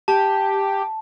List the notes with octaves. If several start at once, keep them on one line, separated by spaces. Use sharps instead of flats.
G4 A5